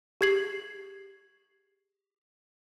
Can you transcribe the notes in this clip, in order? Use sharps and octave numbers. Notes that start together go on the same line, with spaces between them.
G4 G#4 G#6 C7 F#7